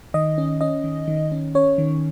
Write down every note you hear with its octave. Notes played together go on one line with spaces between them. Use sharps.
D#3 D#5
C#4
C#4 D#5
D#3
D#3
C#4
C#4 C#5
D#3